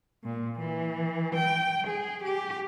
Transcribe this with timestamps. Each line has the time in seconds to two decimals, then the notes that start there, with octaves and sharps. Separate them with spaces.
0.24 A#2
0.59 E3
1.35 G5
1.86 G#4
2.23 G4